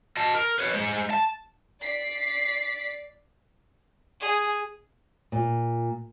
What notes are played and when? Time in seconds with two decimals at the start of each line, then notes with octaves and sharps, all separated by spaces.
0.17 D#5 A5
0.35 A#4
0.59 B4 C#5
0.74 G#3 C5
1.10 A5
1.81 D5 B6 C7
4.20 G#4
5.32 A#2